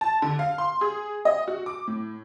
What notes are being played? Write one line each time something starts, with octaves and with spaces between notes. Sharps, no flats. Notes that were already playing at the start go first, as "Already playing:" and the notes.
A5
D3
F5
C6
G#4
D#5
F#4
D6
A2